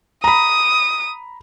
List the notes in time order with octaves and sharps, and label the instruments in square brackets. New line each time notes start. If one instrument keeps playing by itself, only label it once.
[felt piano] A#5 B5 [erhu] D#6